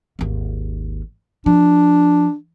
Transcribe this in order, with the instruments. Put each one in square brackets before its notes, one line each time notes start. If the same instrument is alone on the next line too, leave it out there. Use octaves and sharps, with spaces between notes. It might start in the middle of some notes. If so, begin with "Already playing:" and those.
[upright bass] G#1 D#2
[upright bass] F3 [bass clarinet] D4